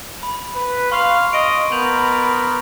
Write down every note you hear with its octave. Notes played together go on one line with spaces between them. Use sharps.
B5
B4
F5 C6 C#6
D#5 D7
B3 A#4 G6 F7 F#7